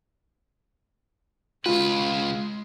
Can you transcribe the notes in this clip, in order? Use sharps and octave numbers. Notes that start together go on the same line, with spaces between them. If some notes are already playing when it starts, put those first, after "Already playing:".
C#2 G#3 F4 B4